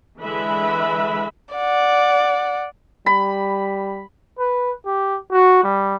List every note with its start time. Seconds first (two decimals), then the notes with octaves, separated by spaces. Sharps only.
0.20 D3 E3 G#3 B4 E5 B5
1.54 D5 F#5
3.06 G3 B5
4.38 B4
4.86 G4
5.32 F#4
5.63 G3